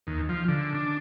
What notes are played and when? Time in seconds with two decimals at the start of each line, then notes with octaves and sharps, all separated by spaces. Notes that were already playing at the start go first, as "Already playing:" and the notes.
0.07 D#2
0.29 F3
0.48 D3
0.74 D4